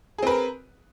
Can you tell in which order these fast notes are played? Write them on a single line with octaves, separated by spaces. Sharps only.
G#4 C4 B4 A#4